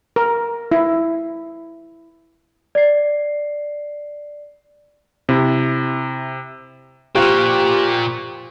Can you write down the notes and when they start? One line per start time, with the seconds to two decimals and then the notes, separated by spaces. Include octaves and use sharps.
0.16 A#4
0.72 E4
2.75 D5 C7
5.29 C3 E4
7.15 A#2 F4 G4 C5 F5 G5 C#6 F#6